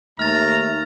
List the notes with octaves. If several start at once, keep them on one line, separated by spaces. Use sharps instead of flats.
D#2 A3 A#5 F6 A6